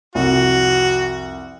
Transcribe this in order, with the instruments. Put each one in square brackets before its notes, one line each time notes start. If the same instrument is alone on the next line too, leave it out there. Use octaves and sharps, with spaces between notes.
[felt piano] C2 F2 [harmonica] F#4